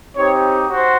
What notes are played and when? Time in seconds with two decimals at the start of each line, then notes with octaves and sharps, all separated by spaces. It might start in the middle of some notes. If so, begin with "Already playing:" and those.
0.17 C4 D#4 G4 C#5
0.68 F#4 C5